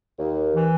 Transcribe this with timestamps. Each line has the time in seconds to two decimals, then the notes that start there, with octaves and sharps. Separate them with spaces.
0.19 D#2
0.55 E3